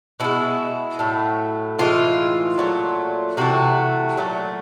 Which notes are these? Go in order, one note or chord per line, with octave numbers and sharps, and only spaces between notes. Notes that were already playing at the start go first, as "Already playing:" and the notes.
B2 G#3 E4
A2 F#3 A3
A2 E3 G#3 F4
A#2 F#3 A3
C3 E3 A3 F#4
A#2 F#3 A3